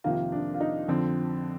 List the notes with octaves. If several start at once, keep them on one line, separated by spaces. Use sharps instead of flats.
F2 C3 D#3 A#3 F4
D4
F4
D#4
F2 D3 F3 C4